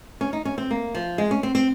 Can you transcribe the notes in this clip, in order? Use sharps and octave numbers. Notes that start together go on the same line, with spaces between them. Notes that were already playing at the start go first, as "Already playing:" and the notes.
C#4
D#4
C#4
C4
A#3
F3
G#3
C#4
C4
C4